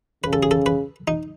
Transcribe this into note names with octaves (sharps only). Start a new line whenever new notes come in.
C#3 B4
A4
G#4
A4
B4
D#4